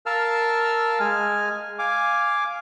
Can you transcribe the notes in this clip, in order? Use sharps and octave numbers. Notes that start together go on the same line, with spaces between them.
A#4 F5 A5 E6 F6
G#3 G#5 F6
F5 G#5 D6